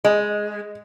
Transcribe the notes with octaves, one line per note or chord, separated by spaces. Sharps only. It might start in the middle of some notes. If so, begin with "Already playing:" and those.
G#3 D#5